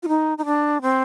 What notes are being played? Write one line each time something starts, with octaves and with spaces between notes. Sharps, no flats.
F4
D#4
D#4
D4
C4